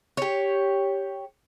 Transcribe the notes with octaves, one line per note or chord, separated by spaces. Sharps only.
G4 C#5